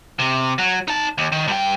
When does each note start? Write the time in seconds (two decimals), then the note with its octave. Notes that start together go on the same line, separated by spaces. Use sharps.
0.19 C3
0.58 F#3
0.88 D#4 A5
1.18 D#2
1.32 D#3
1.48 G2 G5